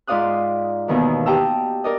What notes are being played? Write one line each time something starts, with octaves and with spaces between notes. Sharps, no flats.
G#2 F4 D5 F5 D#6 F#6
D#2 B2 D#3 E3
G4 D#5 G5 A5 A#5 E6
A#4 D5 D#5